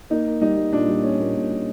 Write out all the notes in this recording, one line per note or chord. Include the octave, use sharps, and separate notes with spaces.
A#3 D#4
A#3
G3 D#4
G3
A#2 D4
G3
A#3 C#4
A#2
A#2
G3